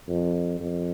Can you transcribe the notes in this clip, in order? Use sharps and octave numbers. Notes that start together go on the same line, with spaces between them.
F2
F2